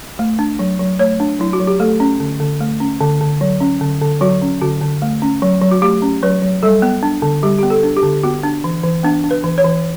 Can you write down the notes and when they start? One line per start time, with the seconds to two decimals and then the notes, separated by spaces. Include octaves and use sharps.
0.19 A3
0.39 D4
0.59 F#3
0.79 F#3
0.99 A3 C#5
1.20 D4
1.39 F#3 E4
1.53 F#4
1.60 F#3
1.67 G4
1.79 A3 A4
2.00 C#4
2.20 D3
2.40 D3
2.61 A3
2.80 C#4
3.01 D3
3.21 D3
3.41 F#3
3.61 C#4
3.81 D3
4.01 D3
4.21 F#3 F#4
4.42 C#4
4.61 D3 F#4
4.82 D3
5.02 A3
5.22 C#4
5.42 F#3
5.62 F#3
5.71 F#4
5.82 A3 G4
6.02 C#4
6.22 F#3 B4
6.42 F#3
6.63 G3 A4
6.82 B3
7.03 D4
7.22 D3
7.43 G3 G4
7.59 B3 G4
7.70 A4
7.83 D4
7.97 G4
8.03 D3
8.24 B3 F#4
8.43 D4
8.64 E3
8.84 E3
9.03 B3 D4
9.24 D4
9.31 B4
9.44 E3
9.58 C#5
9.64 E3